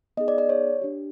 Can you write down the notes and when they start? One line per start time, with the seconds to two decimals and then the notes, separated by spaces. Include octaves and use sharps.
0.17 B3 D#4 G#4 D#5
0.28 D5
0.38 D5
0.49 C#5
0.82 D4 G4